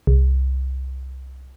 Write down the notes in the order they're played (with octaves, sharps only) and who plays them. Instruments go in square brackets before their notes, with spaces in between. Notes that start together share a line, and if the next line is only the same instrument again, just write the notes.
[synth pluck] C2